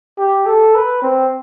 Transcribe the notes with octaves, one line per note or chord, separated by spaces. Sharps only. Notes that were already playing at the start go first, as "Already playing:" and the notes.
G4
A4
B4
C4